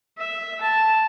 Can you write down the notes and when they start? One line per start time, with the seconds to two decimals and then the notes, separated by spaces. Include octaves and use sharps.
0.18 E5
0.61 A5